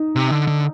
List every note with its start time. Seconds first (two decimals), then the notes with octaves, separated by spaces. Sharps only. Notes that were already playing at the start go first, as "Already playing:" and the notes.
Already playing: D#4
0.16 C3
0.31 D3
0.48 D3